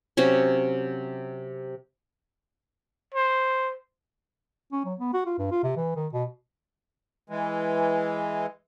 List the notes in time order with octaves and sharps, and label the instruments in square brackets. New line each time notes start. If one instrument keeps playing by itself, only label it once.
[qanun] C3 F#3 C#4
[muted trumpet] C5
[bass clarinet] C#4
F#3
B3
F#4
F4
G2
F4
C3
E3
D#3
B2
[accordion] E3 G#3